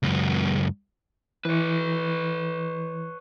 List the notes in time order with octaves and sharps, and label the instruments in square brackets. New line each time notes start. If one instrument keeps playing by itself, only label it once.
[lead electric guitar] C#2 F#2
[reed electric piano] E3 [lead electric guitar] B4 C#5